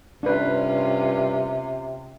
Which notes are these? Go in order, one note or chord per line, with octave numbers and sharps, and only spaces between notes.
G2 C3 C#4 D4 F4 B4